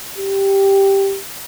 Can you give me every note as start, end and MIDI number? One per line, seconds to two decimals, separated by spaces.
0.18 1.19 67